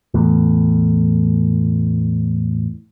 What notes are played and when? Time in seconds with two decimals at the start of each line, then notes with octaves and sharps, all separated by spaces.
0.14 E2 A2